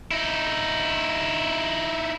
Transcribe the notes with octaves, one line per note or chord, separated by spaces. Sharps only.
D#4 E4